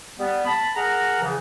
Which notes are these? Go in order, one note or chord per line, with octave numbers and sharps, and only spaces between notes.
G3 B3
A5 B5
G#4 A#4 F#5 A#5
E2 C#3 E3 F3